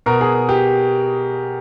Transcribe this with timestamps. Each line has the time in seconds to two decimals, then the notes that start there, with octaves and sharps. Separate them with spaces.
0.06 B2 A#4
0.21 G#4
0.49 G4